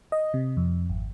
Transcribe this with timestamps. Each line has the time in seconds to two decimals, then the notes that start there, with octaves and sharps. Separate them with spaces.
0.12 D#5
0.34 C3
0.57 F2
0.90 G#1